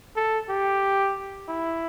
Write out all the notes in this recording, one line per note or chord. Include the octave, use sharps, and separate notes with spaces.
A4
G4
E4